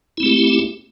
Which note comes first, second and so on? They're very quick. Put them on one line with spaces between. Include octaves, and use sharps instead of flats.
E4 C4 A3 G4